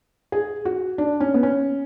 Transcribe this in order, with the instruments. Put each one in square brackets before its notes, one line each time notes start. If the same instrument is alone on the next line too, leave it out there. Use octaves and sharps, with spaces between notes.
[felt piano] G#4
F#4
D4
C#4
B3
C#4